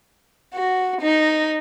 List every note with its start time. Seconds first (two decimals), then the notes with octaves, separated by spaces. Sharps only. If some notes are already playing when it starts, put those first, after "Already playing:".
0.54 F#4
1.01 D#4